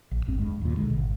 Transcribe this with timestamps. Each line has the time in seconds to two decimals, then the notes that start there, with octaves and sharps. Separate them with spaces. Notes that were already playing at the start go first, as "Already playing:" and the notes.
0.11 A#1
0.26 D1 G#1 G2 C4
0.39 E1 G2 G#3
0.61 D#2 A#2
0.77 C2 B2 D3 G#3
0.93 G#1